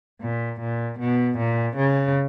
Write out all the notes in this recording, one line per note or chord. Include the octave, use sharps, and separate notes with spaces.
A#2
A#2
B2
A#2
C#3